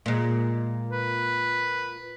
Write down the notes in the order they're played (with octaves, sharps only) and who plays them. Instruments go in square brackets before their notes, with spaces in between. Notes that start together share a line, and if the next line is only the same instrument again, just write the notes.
[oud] A#2 G#3
[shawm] B4